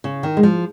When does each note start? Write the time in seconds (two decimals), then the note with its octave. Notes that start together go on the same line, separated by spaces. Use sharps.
0.04 C#3
0.23 D#3
0.37 G#3
0.43 F3